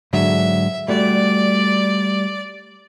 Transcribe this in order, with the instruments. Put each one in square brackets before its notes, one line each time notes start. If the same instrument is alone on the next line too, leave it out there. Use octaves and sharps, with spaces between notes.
[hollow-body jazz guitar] G#2 D3 F#3 [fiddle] E5
[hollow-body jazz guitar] G3 A3 F#4 [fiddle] D5